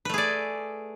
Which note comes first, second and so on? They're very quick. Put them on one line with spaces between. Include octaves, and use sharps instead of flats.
B4 A3 G#4 D5